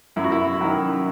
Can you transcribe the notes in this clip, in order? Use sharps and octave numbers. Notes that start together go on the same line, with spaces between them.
F#2 E4
F#4
E4
D#3 F#3